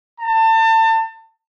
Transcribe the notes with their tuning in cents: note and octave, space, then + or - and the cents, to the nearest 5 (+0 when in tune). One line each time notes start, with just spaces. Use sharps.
A5 +30